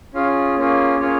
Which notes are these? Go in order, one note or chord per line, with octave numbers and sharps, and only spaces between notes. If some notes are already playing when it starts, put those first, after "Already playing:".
C#4 F4 G#4 F5
A#3 C#4 F4 G#4
A#3 C#4 F4 G#4 C#5